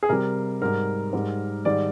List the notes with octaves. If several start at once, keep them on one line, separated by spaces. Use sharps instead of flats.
G#4
C3 G3 A#4
G#2 G3 A#4
G#2 G3
G#2 D#3 G3 D5